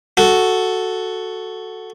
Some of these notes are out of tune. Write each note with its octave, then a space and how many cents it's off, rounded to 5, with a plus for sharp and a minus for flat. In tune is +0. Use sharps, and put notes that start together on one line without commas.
F#4 +0 A4 +0